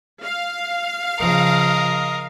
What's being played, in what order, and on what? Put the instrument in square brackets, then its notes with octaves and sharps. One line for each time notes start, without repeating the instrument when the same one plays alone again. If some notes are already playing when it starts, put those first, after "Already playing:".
[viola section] F5
[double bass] C#3 F3 [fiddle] A#4 D#5